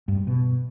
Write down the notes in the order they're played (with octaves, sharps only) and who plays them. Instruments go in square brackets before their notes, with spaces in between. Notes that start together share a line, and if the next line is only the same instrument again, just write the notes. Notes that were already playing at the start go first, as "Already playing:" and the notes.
[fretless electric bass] G2
G#2
B2